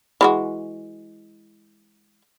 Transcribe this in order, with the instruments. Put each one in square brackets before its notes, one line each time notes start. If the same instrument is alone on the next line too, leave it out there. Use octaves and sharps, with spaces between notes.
[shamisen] E3 G#3 F#4